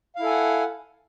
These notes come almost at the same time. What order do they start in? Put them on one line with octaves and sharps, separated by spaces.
F5 E4 A4 G#5 F#5